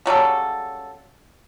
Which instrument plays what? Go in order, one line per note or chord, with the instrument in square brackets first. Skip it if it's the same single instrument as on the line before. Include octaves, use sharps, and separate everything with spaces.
[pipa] C#3 F#3 G3 A4